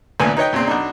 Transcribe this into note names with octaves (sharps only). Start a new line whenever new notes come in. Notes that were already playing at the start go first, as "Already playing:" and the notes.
A1 D2 A#2 B3 G#5
D#4 B4 C#5 D#5 G5
E2 A#2 C#3 C4
B1 D4 D#4